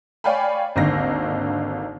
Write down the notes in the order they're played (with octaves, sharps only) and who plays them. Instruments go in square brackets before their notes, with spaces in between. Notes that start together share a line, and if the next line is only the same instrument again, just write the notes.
[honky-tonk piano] C#5 D5 F5 G5 G#5 B5
G#1 D#2 D3 D#4 A#6